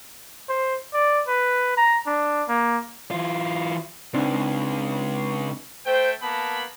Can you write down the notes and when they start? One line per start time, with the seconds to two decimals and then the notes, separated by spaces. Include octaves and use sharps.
0.49 C5
0.94 D5
1.28 B4
1.77 A#5
2.07 D4
2.48 A#3
3.11 E3 F4
4.14 C#2 C4 D4 D#4
5.86 A3 C5 G5
6.22 A#3 B3 A5 B5